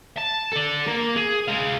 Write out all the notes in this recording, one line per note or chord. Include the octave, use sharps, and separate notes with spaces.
A5
A4 D5
A#3
G#4
G#3 F5